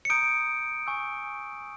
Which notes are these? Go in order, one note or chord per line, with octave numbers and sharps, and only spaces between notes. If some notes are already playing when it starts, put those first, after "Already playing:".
C#7
A#5 D#6 G6 D7
G#5 C#6 E6 G6